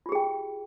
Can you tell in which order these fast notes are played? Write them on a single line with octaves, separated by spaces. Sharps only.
F4 G4 G#4 G5